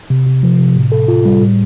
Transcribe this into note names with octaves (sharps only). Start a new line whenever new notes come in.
C3
C3
F3
C3
A2
A4
F4
G3
A2